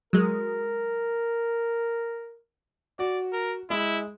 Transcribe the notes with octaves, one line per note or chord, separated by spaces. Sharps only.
F#3 G#3 A#4
F#4 D5
A#4
G#3 E4